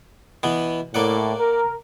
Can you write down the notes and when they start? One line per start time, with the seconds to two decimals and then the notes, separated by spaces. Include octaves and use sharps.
0.43 B2 E3 B3
0.94 A2 A#3 D5 F#5
1.40 A#4